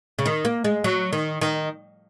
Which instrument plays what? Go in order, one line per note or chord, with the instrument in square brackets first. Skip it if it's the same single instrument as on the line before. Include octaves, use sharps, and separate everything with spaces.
[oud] C#3
D#3
A#3
G#3
F#3
D#3
D#3